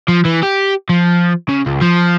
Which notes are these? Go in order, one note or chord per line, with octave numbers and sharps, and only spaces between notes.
F3
E3
G4
F3
C#3
C#2
F3